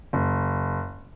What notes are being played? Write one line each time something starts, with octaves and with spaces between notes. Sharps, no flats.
F#1